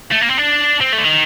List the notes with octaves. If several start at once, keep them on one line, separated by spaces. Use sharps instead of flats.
A3
A#3
C4
D4
C4
A3
D3
D#3